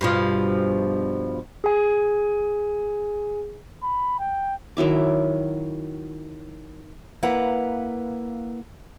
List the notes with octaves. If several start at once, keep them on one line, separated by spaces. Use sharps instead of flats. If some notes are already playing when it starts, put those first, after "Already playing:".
G2 B2 F3
G#4 G#5
B5
G5
D#3 F#3 E4 D6
A#3 E4 B4 F5 F#5 A#5